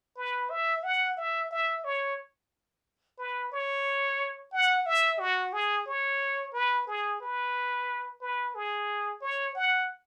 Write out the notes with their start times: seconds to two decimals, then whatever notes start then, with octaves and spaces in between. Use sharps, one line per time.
0.17 B4
0.50 E5
0.83 F#5
1.17 E5
1.51 E5
1.84 C#5
3.18 B4
3.52 C#5
4.52 F#5
4.86 E5
5.19 F#4
5.53 G#4
5.86 C#5
6.53 B4
6.87 G#4
7.21 B4
8.21 B4
8.55 G#4
9.21 C#5
9.55 F#5